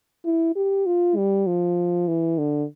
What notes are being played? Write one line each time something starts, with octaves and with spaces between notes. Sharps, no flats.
E4
G4
F4
G3
F3
E3
D3